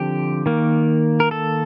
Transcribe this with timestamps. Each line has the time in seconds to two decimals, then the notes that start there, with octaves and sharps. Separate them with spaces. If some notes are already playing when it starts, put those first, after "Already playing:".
Already playing: D3 F3 C4 G4
0.46 D#3 A#3
1.20 A#4
1.31 A4